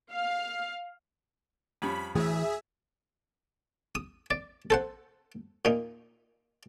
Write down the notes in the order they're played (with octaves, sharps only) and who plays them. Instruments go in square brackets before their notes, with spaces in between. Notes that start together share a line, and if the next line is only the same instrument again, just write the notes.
[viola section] F5
[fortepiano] F2 G3 C#4 [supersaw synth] B5
[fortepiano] D2 A2 [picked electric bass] E3 [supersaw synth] G#4 E5
[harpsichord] D#6
D5
A4 C5 F#5
A#2 D#4